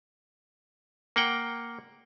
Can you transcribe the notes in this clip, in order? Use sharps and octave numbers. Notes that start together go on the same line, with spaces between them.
A#3 F#5 G5